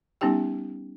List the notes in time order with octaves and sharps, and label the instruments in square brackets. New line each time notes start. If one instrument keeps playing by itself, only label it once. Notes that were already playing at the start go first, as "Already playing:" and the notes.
[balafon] G3 B3 C#4 D#4 G4 G5